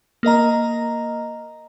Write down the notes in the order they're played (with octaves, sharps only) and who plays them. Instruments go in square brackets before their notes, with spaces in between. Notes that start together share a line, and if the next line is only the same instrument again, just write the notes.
[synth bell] A#3 A#4 D#5 A#5